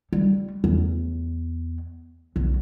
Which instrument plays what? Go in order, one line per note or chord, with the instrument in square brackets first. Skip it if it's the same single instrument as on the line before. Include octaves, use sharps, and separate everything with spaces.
[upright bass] G3
E2
B1